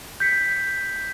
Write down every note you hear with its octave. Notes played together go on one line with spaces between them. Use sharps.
G6 B6 C#7